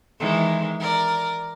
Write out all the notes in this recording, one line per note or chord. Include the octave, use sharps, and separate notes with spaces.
D#3 E3 G#3
A#4 D5